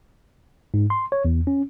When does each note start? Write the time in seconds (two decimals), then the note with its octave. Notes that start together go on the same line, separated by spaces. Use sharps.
0.74 G#2
0.90 C6
1.12 C#5
1.25 E2
1.47 C#4